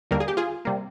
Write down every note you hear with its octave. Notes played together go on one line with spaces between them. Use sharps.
D#2 D3 G3 A#3 A#4
G#4
G4
F4 G#4
C3 G3 A#3